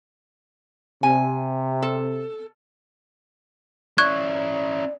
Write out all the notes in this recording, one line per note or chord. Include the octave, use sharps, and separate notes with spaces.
C3 G#5
A4
C#4 E4 D5 C#6 F#6 G#6